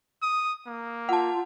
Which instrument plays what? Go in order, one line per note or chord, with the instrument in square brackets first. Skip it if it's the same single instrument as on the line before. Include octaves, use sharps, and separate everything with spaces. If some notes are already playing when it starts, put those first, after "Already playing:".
[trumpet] D#6
A#3
[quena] F4 [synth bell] F#5 A5